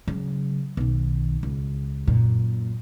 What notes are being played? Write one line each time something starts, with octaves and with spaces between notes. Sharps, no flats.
C#3 F#3
B1 D#3
C#2
F#2 A#2